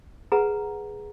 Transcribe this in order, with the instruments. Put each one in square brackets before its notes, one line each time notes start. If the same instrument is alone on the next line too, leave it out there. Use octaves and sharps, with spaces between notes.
[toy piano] G#4 B4 F#5 A#5